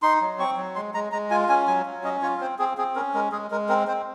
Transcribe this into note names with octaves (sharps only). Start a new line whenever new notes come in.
D#4 C6
F#3
C4 C#6
F#3
G#3 C6
G#3 A#5
G#3 A#5
F4 G#5
C#4 G#5
F#3 G#5
F#3
C#4 D#5
F4 C#5
C4 C5
C4 G#4
C4 G#4
C#4 A#4
G#3 A#4
G#3 G#4
G#3 A#4
C4 A#4
C4 C5